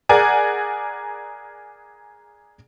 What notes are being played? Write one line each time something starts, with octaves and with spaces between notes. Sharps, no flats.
G#4 A#4 D5 F#5 G#5